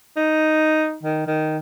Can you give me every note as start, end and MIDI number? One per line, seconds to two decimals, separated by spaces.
0.16 0.95 63
1.03 1.24 51
1.26 1.58 51